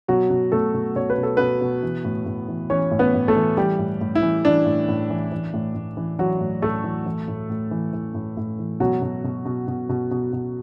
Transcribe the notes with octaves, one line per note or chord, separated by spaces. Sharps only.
B2 F#3 F#4
B2
B2 A3 A4
B2
B2 C#5
B4
B2
A4
B2 B3 B4
B2
E3
A2
A2
E3
E3 C#4 C#5
A2
B3 B4
A2
A3 A4
E3
E3 G3 G4
A2
A2
E4
E3
E3 D4
A2
A2
E3
E3
A2
A2
E3
E3 F#3 F#4
A2
A2 A3 A4
E3
E3
A2
A2
E3
E3
A2
A2
E3
B2 F#3 F#4
B2
B2
B2
B2
B2
B2
B2